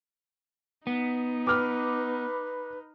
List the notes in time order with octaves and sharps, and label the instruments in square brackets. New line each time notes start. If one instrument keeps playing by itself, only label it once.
[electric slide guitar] B3 [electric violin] D#4
[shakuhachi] B4 [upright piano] D6 F6